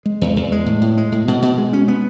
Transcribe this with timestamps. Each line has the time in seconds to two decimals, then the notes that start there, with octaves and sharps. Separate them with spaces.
0.06 G#3
0.21 E2
0.36 E2
0.52 G#3
0.66 A2
0.82 A2
0.97 G#3
1.12 A2
1.28 B2
1.42 B2
1.58 G#3
1.73 C#4
1.88 B3